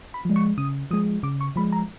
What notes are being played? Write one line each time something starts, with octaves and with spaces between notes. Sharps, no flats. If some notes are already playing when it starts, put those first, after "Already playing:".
B5
F3 G#3
C#6
C#3 D#6
F3 G#3 D#6
C#3 D6
C#6
F3 G#3 B5
A#5